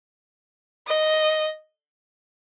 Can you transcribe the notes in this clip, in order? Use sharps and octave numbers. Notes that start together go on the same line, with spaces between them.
D#5